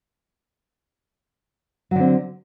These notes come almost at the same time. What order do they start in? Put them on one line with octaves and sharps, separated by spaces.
F#3 D3 C4